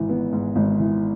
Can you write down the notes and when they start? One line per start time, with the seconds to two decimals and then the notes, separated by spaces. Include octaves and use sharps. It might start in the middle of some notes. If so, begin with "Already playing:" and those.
Already playing: G#1 G#2 E3
0.09 B3
0.33 G#2
0.56 G#1
0.80 E3